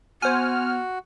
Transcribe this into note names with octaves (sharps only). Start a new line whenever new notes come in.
B3 F#4 C5 G#5 F6